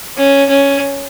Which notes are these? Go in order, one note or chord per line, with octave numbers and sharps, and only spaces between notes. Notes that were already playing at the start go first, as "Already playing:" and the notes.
C#4
C#4